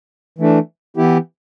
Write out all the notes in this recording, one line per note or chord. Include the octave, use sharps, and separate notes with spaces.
E3 A3 D4
E3 B3 E4 G4